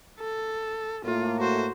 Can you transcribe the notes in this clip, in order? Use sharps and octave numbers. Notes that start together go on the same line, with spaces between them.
A4
A2 A3 A#3 F4
F#4 C5